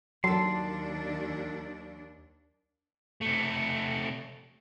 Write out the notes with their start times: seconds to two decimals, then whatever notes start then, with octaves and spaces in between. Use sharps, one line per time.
0.24 D#2 F#3 D4 A4 B5 C6
3.21 C3 A3